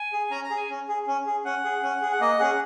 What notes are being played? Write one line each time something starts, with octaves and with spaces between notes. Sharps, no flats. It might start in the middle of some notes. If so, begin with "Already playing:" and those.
Already playing: G#5
G#4
C#4 A#5
A#5
G#4
G#5
C#4
G#4
C#4
G#4
C#4 F#5
G#4
C#4
G#4
F#5
A#3 D#5
C#4 G#4 F#5